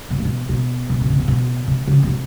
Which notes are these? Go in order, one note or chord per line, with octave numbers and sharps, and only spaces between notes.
B2
A#2
B2
B2
B2
D3
C#3
C3
B2
C3
C#3
B2
C3